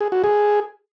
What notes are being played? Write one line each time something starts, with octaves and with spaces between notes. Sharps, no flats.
G#4
F#4
G#4